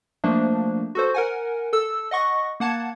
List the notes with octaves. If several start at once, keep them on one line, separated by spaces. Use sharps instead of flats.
F3 A3 A#3 D4
F#4 A4 C5
A#4 F#5 G#5
A4 E6
D#5 F#5 C#6 A#6
A#3 F#5 A5 G#6